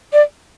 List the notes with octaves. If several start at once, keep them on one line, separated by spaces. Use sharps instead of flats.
D5